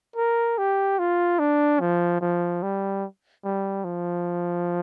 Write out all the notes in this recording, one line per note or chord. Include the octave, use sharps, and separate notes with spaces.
A#4
G4
F4
D4
F3
F3
G3
G3
F3